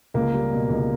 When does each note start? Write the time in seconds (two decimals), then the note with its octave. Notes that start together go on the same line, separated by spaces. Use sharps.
0.14 C#2 A#3
0.34 G3
0.52 B2
0.70 C#2